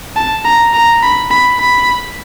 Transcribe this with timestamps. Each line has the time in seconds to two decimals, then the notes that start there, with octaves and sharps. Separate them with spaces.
0.16 A5
0.44 A#5
0.74 A#5
1.02 B5
1.31 B5
1.60 B5